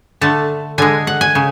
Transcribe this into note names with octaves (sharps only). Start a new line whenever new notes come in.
D3 A3 A5
D3 G#3 G#5
F#5
G#5
C#3